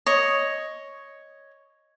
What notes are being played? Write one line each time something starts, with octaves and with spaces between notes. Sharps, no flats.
C#5 D#5